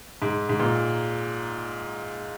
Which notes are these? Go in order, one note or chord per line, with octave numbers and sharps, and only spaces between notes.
G#2
G#2
A#2